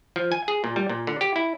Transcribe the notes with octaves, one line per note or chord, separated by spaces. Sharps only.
F3
G#5
G#4
A#2
G3
A#2
D3
G4
E4